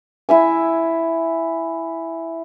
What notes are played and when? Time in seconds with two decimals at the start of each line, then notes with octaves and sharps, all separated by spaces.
0.29 E4 E5 G#5